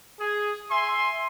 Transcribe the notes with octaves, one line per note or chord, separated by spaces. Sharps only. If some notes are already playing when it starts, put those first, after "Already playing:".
G#4
E5 G#5 C6